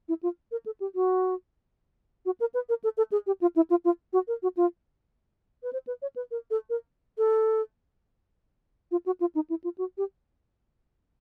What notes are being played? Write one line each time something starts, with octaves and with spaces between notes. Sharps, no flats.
E4
F4
A#4
A4
G4
F#4
F#4
A#4
B4
A#4
A4
A4
G#4
G4
F4
E4
F4
F4
F#4
A#4
F#4
F4
B4
C5
B4
C#5
B4
A#4
A4
A#4
A4
F4
F#4
F4
D#4
E4
F4
F#4
G4